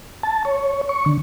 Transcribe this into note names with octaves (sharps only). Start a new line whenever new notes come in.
A5
C#5
C#6
D3